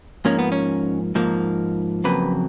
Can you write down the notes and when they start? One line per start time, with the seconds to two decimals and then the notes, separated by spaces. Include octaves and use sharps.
0.25 G#2 F3 A#3 C#4
0.39 B3
0.52 C#4
1.15 G#2 F3 A#3
2.04 F2 C#3 F#3 A#3 B4